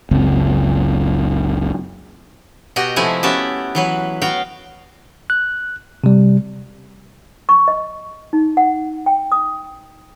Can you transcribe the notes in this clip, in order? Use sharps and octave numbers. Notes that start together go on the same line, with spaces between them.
F#1 C#2 C4
B2 F#4 G4 D#5 G5
C3 F3 G#3 A3 E4 G#5
B3 C#4 F#4 G4 E5 A5
E3 F#3 B4
B3 F#4 F5 G5
F#6
C3 G3
C#6
D#5
D#4
F#5
G5
D#6